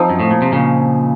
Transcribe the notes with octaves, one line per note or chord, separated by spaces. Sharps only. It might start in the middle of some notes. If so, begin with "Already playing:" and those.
Already playing: F3 C4 D#4
F#2
A2
A#2
C3
A#2 C#3